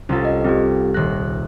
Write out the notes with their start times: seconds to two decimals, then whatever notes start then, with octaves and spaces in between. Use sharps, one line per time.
0.09 C2 C#4 F4 A4
0.25 D#5
0.45 G3 C4 F4 G4
0.94 D#1 F#6 A#6